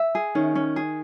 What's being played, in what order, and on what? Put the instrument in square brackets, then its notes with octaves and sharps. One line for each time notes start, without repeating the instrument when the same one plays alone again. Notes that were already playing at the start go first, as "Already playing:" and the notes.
Already playing: [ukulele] E5
G#4
[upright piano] D#3 [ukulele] C#4
[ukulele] C#4
G#4